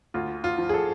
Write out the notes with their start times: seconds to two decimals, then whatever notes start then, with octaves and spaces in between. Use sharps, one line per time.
0.14 D2 F4
0.44 F4
0.58 F3
0.69 G#4
0.74 A4